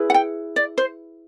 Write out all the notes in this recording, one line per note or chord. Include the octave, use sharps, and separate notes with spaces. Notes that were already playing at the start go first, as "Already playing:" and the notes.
Already playing: E4 G#4 B4
F#5
G5
D5
C5